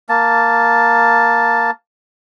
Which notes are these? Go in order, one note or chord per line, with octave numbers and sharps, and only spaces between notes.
A#3 A5